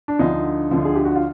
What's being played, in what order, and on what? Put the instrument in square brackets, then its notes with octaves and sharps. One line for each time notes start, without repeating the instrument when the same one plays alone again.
[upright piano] D4
D2 D3 F3 D#4
D2 D3 F3
G#4
G4
F#4
F4